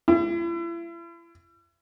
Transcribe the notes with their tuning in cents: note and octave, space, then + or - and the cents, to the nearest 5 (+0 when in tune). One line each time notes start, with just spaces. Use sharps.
E4 +40